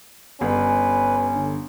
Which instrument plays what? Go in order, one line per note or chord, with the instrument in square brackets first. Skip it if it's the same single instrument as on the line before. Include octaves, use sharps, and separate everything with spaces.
[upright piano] G1 [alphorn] C#4 [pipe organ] B4
[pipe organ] D3